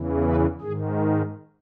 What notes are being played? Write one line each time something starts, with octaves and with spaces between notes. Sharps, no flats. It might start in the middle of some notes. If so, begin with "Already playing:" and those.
Already playing: E2 C#3 E3
B4
G#2 D#3 G#4